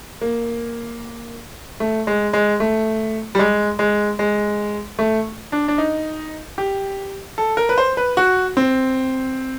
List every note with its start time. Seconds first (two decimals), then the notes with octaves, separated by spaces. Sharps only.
0.21 A#3
1.80 A3
2.07 G#3
2.33 G#3
2.60 A3
3.35 G3
3.39 G#3
3.79 G#3
4.19 G#3
4.99 A3
5.52 D4
5.68 D4
5.78 D#4
6.58 G4
7.38 A4
7.57 A#4
7.69 B4
7.78 C5
7.97 B4
8.17 F#4
8.57 C4